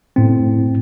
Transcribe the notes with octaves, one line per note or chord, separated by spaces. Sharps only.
A2 C4